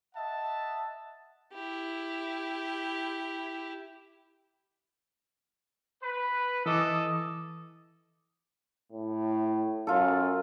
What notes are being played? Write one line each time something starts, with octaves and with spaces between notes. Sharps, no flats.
D#5 E5 F#5 A5
E4 G4
B4
E3 A4 D#5 D6 D#6
A2
F#2 F4 A4